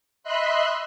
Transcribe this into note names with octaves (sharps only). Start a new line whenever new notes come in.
D#5 E5 B5 C6 F#6